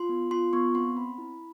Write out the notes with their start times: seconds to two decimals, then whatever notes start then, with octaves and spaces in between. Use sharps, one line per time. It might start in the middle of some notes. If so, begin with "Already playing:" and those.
Already playing: F4 C6
0.09 B3
0.31 F4 C6
0.53 B3 C#6
0.74 C4 C6
0.96 C4 B5
1.18 E4